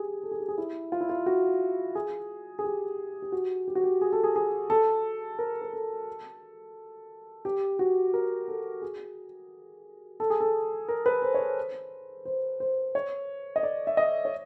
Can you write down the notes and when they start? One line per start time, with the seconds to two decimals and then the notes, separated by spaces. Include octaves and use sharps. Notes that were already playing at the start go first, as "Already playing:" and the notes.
Already playing: G4 G#4
0.23 A4
0.31 G#4
0.40 G4
0.48 G#4
0.58 E4
0.92 F4
1.01 E4
1.09 F4
1.26 F#4
1.95 G#4
2.59 G#4
2.64 G4
3.22 G4
3.32 F#4
3.68 G4
3.75 F#4
3.83 G4
4.01 G#4
4.13 A4
4.24 G#4
4.36 G#4
4.70 A4
5.39 A#4
5.62 A#4
5.73 A4
7.45 G4
7.79 F#4
8.14 A#4
8.48 A4
8.82 G#4
10.20 A4
10.30 G#4
10.40 A4
10.88 A#4
11.06 B4
11.22 C5
11.34 C#5
11.40 C5
12.25 C5
12.60 C5
12.95 C#5
13.56 D#5
13.63 D5
13.87 E5
13.97 D#5
14.25 C#5